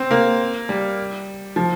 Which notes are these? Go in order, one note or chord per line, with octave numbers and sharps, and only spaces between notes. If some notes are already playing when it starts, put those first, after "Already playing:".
Already playing: C4
A#3
G3
F3